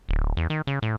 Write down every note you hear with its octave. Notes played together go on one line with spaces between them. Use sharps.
D1
E2
D#3
C#3
A2